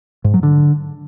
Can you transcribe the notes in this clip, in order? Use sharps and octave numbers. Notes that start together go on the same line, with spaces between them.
G#2
F#3
D3